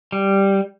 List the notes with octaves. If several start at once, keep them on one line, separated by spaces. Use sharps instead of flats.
G3